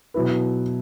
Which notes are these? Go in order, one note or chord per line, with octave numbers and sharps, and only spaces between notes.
B2 F#3 E4 B4